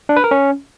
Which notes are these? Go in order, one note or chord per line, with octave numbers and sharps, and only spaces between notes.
D4
B4
A#4
C#4